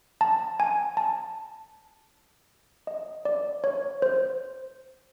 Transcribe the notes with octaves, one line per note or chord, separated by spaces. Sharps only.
A5
G#5
A5
D#5
D5
C#5
C5